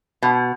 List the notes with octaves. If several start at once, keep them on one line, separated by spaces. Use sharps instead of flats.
B2